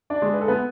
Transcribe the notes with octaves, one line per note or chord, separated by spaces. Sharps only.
D4 D5
G#3
B4
A4
B3 B4